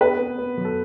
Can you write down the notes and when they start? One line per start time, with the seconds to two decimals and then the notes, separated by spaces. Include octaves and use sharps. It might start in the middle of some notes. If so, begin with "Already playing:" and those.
0.01 B3 B4
0.20 B3
0.38 B3
0.57 F#2
0.65 A4